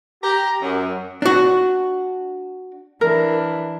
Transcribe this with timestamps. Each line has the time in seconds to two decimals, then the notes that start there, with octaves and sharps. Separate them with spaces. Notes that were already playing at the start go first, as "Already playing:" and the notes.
0.23 G4 A#5
0.61 F#2
1.22 D4 F#4
3.01 E3 D4 E4 A#4